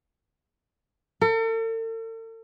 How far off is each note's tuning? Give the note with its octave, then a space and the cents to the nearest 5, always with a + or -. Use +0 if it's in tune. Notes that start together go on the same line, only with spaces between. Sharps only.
A4 +45